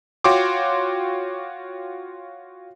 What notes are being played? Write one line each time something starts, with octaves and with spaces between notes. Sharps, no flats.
F4 F#4 C#5 G5 C6 D6